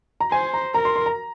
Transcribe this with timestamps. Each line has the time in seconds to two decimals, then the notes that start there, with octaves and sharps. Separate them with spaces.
0.20 A#5
0.31 C5 G#5
0.53 A#5
0.74 A#4 A#5
0.85 C6
0.96 C6
1.06 A#5